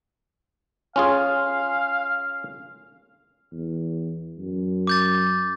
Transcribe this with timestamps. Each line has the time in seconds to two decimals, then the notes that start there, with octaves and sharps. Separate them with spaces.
0.96 C#4 F4 G#4 F5
3.52 E2
4.39 F#2
4.87 D6 G6 A6